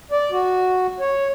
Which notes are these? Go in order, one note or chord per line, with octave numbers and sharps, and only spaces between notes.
D5
F#4
C#5